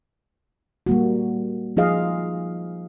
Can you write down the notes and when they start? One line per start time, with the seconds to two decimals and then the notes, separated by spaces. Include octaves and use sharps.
0.87 G3 A#3 F#4
1.77 F3 D#4 F4 G#4 D#5 F5